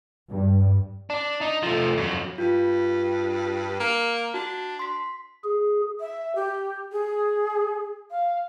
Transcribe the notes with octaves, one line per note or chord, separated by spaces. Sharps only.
G2
D4
D#4
F3 A3
F2 F#3
G2 F4
A#3
D4 F#4
C6 B6
G#4
E5
G4
G#4
F5